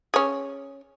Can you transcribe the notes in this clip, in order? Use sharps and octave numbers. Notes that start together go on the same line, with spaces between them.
C#4 G#4